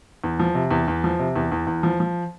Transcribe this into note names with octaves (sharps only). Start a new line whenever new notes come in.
E2
F3
C3
E2
E2
F3
C3
E2
E2
E2
F3
F3